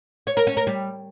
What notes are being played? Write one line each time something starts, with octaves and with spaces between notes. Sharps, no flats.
C#5
A#4
C#4
A#4
G3